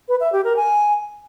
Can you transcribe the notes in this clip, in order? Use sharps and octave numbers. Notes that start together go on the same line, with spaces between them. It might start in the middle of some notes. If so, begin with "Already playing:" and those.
B4
E5
G4
A#4
G#5